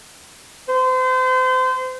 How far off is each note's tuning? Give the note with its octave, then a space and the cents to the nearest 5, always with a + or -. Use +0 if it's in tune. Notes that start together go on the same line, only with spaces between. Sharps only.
C5 -35